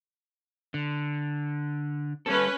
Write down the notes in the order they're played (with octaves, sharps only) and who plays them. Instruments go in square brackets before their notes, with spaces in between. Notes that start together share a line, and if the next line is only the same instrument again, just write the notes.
[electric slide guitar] D3
[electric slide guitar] G3 A4 [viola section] C#4 B4